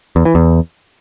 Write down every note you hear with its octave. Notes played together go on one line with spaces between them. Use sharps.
E2
E3
E2